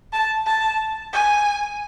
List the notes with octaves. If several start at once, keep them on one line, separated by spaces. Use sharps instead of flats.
A5
A5
G#5